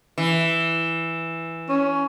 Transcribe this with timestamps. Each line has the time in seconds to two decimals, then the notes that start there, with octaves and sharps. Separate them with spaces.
0.18 E3
1.69 C#4